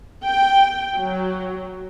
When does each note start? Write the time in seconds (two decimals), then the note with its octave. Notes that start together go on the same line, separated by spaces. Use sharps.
0.23 G5
0.98 F#3